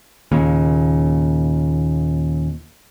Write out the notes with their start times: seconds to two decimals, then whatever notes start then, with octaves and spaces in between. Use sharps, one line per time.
0.32 D#2 A#2 C#3